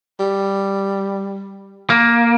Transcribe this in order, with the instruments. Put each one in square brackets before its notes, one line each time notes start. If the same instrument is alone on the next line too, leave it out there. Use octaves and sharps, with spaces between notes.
[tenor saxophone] G3
[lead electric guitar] A#3